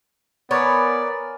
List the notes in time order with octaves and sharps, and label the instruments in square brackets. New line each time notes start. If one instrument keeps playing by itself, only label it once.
[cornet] B3 [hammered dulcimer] A#4 G#5 B5 [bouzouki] C#5 [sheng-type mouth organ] D5